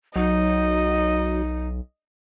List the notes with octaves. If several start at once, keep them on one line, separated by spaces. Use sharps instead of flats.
B1 F#3 D#4 D#5